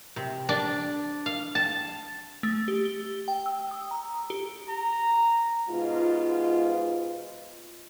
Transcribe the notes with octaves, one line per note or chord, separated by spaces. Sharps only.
C3
D4
F5
A5
A3
G4
G7
G5
E6
D#6
A#5
G4
A#5
G#2 B2 F4